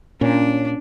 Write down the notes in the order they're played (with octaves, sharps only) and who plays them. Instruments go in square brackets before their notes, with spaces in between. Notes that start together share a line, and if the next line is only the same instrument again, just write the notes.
[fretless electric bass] A#2 [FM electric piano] C#4 [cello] D4